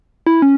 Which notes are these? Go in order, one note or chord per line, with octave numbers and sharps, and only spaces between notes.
E4
C#4